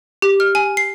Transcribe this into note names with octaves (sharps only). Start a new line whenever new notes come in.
G4
F6
G#5
C7